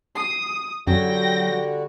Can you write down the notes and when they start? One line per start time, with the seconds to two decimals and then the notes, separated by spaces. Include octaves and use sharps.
0.15 D#6 C7
0.87 F#2 D3 F#3 G3 F#4 G5 A#6